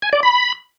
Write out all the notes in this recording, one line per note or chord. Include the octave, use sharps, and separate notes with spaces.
G#5
D5
B5